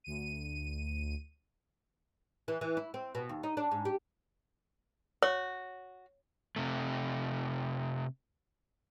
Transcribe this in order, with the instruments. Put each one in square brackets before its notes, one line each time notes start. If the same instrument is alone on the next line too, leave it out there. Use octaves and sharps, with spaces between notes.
[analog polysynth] D2 D#7
[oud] E3
E3
E4
C4
B2
D#2
D#4
D4
G#2
G4
[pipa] F#4 [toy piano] C#5
[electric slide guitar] C3 A3